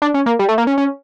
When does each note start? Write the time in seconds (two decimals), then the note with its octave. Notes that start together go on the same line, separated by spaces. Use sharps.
0.02 D4
0.14 C#4
0.26 A#3
0.39 G3
0.49 A3
0.58 A#3
0.67 C#4
0.78 C#4